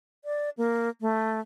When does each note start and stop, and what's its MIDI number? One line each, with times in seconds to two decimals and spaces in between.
0.25 0.50 74
0.57 0.89 58
1.01 1.40 57